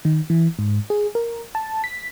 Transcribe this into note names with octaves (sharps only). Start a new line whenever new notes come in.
D#3
E3
G#2
G#4
A#4
A5
B6